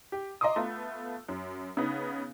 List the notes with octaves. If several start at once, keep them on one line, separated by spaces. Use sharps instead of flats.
G4
D#5 A#5 C6 D6 D#6
A3 B3 F4
F#2
C#3 B3 D#4